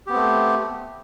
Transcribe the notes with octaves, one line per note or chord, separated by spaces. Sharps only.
A3 B3 C4 G4